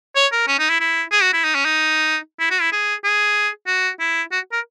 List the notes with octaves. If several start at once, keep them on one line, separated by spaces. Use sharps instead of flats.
C#5
A#4
C#4
D#4
E4
E4
G#4
F#4
E4
D#4
C#4
D#4
E4
F#4
E4
G#4
G#4
F#4
E4
F#4
A#4